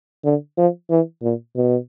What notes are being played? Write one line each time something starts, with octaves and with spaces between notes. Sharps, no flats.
D3
F3
E3
A#2
B2